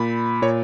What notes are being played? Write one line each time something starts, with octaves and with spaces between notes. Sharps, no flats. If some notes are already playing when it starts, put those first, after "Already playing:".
Already playing: A#2 B5
A#2 C#5